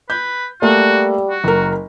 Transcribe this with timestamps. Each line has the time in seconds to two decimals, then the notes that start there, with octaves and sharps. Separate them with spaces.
0.10 B4 G6
0.62 G3 A3 A#3 F#4
1.30 F#4
1.44 F#1 A#4